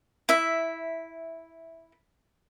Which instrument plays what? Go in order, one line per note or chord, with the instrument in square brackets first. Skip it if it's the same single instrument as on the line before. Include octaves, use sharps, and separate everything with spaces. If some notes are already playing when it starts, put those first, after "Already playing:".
[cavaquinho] E4 E5